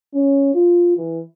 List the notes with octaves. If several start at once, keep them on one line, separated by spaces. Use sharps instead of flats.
C#4
F4
E3